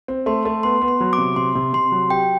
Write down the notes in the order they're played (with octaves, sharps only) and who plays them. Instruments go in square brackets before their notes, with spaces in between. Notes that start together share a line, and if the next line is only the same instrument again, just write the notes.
[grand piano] C4
[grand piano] A3 [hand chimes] C6
[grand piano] A3
[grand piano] B3 [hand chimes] C6
[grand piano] B3
[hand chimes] C6
[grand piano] F#3
[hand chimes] D6
[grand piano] C3
[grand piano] C3 [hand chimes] C6
[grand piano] C3
[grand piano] C3 [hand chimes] C6
[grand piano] F#3
[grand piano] G4 [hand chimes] G5